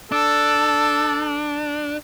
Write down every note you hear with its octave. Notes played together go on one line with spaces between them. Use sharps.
D4 A4